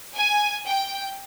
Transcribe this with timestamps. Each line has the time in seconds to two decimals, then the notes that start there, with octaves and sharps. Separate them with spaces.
0.15 G#5
0.66 G5